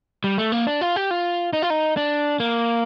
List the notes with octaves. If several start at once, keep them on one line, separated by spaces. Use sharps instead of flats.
G3
A3
A#3
D4
F4
G4
F4
D#4
F4
D#4
D4
A#3